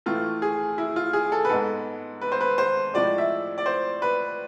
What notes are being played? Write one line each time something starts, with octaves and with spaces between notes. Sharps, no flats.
A2 E3 A3 F4
G#4
E4
F4
G#4
A4
B4
G#2 G#3 B3 A4
B4
C5
B4
C5
A2 F3 G#3 D5
E5
D5
C5
B4